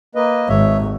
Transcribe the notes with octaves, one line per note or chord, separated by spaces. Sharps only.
A#3 B4 D#5
G#1 C#5 E5